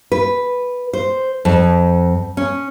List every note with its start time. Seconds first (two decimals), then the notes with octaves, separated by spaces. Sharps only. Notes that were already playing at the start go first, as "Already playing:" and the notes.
0.12 B4
0.93 C5
1.45 F2
2.37 C#4